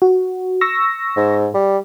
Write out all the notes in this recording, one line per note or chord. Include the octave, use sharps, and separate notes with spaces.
F#4
C#6 E6 A#6
G#2
G3